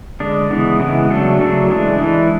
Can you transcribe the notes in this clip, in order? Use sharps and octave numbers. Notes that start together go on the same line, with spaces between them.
D3 G#3 D4
C#3 E3 G#3 B3
C#3 E3 G#3 B3
C#3 F#3 A3 D4 A4
C#3 F#3 A3 D4 A4
E3 G#3 D4
E3 G#3 D4